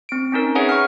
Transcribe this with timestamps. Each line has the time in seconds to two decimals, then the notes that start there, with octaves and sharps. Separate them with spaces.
0.09 C4 D7
0.32 C4 C#4 D#4 A#4
0.55 G#4 B4 C#5 E5 F#5 G#5
0.69 C#6 F6